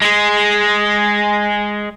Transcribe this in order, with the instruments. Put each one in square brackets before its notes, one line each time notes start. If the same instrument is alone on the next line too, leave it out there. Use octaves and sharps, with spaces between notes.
[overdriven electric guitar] G#3 G#4